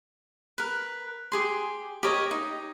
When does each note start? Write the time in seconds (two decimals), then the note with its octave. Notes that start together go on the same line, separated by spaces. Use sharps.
0.58 A#4 B4
1.32 G4 G#4 C6
2.03 G4 A#4 C#5 D#5
2.31 D#4